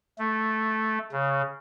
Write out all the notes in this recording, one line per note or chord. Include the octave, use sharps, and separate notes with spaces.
A3
C#3